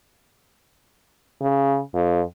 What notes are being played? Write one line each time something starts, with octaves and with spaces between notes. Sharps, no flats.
C#3
F2